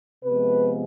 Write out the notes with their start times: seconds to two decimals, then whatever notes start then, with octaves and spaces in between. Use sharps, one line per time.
0.25 C3 F3 G#3 B3 B4